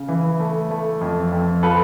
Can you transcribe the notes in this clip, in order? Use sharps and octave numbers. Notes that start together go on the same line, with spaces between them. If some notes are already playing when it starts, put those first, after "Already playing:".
Already playing: C#3
E3
A3
A3
F2
F2
F3 A4 B4